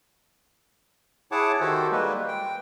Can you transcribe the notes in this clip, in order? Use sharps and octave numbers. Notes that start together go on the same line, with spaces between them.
E4 G#4 C#5 F#5 A5 D6
D#3 F#4 G4 A4 C5
G3 G#3 A#3 B4
G5